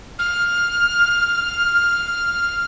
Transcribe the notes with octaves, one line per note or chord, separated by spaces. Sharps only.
F6